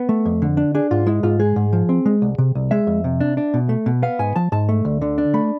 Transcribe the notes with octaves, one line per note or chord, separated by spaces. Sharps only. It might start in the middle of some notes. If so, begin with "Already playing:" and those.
Already playing: B3
A3
F2
D3
D4
D4 G#4
G#2 F4
G#3 E4
G#2 F4
G#3 G#4
G#2
F3
C4
G#3
C2
C3
C2
G#3 E5
F2
C3
D4
D4
B2
A3
B2
B3 F5
G#2 G#5
F3 A5
G#2 A5
A3
D2
D3
D4
A3 B5